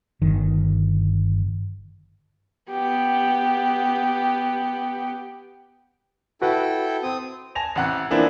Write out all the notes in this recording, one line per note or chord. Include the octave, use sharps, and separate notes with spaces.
G1 D#3
B3 G4
E4 F#4 A4 B4 F#5 G5
C4 D#6
G#5 A5 A#6 F7
A1 C3 F#5 F#6 C#7
E3 F3 A#3 C4 D4 E4